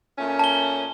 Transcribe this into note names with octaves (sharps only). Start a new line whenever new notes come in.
A#2 A3 C#4
A5 G7